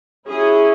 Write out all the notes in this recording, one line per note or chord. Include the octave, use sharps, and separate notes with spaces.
F#3 C#4 E4 G#4